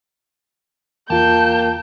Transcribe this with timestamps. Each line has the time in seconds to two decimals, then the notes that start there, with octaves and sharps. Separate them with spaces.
1.10 E2 A#3 F4 G5 A5 G6